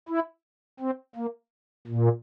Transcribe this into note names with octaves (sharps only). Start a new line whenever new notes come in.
E4
C4
A#3
A#2